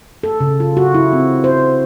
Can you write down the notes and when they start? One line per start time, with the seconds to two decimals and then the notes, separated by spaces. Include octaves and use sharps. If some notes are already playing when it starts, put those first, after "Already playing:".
0.23 A4
0.40 C#3
0.60 F4
0.77 F#4
0.94 E4
1.13 C4
1.44 C5